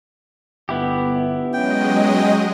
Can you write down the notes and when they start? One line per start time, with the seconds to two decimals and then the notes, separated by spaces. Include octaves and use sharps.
0.69 G1 B3 E4 G4
1.53 F#3 G#3 C#4 D#5 G5